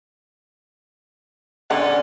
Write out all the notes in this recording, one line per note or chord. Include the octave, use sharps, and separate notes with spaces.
D3 C#4 D5 F#5